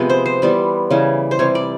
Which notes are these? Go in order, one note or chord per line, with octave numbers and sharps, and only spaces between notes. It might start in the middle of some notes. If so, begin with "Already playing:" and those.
Already playing: C3 F3 G#3 B3
C5
C5
E3 G3 B3
C#3 E3 G3
C5
C3 E3 G3 C#5
D5